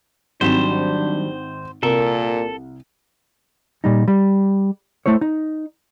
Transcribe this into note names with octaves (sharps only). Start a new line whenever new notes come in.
G#1 D#3 F#3 G3 C4 D4 C5 E7
C2 A#2 A4 A#4
A#2 G3 D#4
G3
A3 E4 C5 C#5
D#4